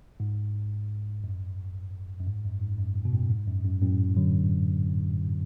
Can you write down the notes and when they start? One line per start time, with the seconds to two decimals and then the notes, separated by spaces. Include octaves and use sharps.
0.20 G#2
1.24 F#2
2.20 F#2
2.27 G#2
2.44 F#2
2.62 G#2
2.79 F#2
2.96 G#2
3.05 B2
3.13 F#2 A2
3.30 G#2
3.48 F#2
3.65 F#2
3.82 F#2 A2
4.17 D3 F#3